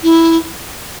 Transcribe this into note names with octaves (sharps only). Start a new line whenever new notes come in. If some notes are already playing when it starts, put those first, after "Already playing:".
E4